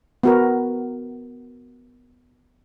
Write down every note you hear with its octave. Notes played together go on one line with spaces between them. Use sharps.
B3 F#4 A#4